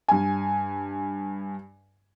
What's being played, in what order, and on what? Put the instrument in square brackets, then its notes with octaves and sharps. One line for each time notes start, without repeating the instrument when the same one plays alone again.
[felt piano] G2 G#5